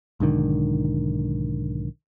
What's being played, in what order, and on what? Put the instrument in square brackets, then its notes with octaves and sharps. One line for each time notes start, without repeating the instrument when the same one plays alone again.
[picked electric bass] B1 G#2 D3 D#3